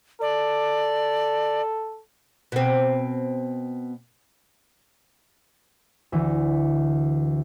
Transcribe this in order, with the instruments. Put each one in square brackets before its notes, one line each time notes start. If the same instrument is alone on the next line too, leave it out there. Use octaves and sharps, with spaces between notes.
[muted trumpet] A4 [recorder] D5
[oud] B2 C4
[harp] D2 E3